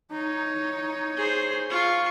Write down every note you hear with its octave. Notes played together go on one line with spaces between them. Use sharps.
D#4 C#5
G#4 C5
F4 C#6